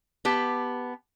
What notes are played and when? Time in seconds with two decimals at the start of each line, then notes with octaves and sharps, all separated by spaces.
0.25 B3 G4 A5